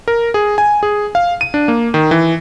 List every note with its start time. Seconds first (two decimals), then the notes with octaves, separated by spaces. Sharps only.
0.08 A#4
0.34 G#4
0.58 G#5
0.83 G#4
1.15 F5
1.41 D#7
1.54 D4
1.68 A#3
1.94 D#3
2.11 E3